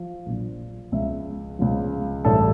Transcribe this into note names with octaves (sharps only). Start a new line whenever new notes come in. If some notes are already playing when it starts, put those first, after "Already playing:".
Already playing: F3
A#1 A#2 F3
C#2 C#3 F3 E5
C#2 C#3 F3
A1 G2 E3 A4